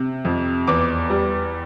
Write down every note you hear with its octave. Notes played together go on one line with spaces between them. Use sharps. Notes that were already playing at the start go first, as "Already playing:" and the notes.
Already playing: C3
F2
E2 D6
G3